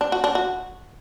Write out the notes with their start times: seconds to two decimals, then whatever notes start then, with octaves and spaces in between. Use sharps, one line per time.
0.01 D4
0.12 F#4
0.24 D4
0.35 F#4